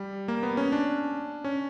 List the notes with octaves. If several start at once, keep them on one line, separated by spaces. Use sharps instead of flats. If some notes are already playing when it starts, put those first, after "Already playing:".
Already playing: G3
A#3
B3
C#4
D4
C#4